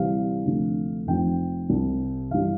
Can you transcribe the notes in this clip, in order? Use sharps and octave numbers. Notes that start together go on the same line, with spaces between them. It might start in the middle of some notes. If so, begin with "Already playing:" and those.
Already playing: D2 C3 E3 G3 F5
D2 C3 F3 A3
F1 F2 C3 F3 G5
C2 C3 G3
G1 G2 E3 G3 F5